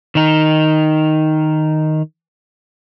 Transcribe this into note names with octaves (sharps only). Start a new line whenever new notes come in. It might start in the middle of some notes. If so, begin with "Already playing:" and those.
D#3 D#4